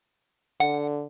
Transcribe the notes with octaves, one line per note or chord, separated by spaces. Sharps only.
D3 F#5